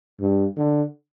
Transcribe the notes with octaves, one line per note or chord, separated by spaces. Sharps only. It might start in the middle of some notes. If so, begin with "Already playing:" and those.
G2
D3